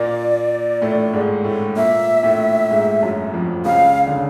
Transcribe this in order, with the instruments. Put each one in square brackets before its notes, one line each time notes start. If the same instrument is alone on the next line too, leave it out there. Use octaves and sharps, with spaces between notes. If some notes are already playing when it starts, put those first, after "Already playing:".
Already playing: [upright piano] A#2 A#3 [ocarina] D5
[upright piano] A2 A3
G#2 G#3
A2 A3
[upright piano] A#2 A#3 [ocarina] E5
[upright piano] A2 A3
G#2 G#3
F#2 F#3
F2 F3
[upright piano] C#2 C#3 [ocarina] F5
[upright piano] D3
C#3